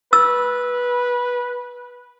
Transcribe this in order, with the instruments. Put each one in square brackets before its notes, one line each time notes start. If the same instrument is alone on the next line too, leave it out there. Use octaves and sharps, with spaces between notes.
[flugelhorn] B4 [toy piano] E6